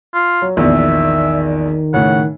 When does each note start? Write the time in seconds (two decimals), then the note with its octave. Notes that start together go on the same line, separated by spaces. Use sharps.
0.14 F4
0.42 F#3
0.57 A#1 E2 D#3 E5
1.94 A2 C#3 F#5